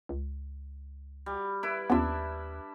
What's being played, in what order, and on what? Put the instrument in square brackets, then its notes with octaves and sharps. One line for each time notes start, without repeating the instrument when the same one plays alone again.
[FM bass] C#2
[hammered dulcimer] G3
[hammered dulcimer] E4 B4 [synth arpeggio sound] B5
[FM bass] D#2 [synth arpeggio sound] B3 C#4 F4 [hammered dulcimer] D4 E5